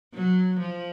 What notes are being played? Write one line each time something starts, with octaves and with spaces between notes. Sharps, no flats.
F#3
F3